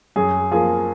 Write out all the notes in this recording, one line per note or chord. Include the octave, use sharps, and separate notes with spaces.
F#2 G#4
F3 A#3 G#4